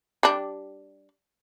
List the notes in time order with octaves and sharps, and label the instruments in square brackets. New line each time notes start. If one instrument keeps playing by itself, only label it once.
[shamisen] G3 D4